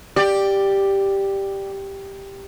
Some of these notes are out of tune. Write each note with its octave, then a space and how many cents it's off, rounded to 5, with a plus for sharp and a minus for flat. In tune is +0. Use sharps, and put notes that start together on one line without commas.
G4 +0 D5 +10